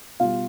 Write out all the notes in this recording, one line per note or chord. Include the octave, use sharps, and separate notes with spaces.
B2 G3 F4 F5